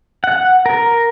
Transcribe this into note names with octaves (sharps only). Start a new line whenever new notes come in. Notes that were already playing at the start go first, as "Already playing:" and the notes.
F#5
A#4